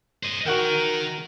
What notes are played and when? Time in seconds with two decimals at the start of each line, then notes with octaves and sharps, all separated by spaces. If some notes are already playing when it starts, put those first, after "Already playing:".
0.23 C5 D#5
0.46 D#3 F#4 A#4 F#5 G5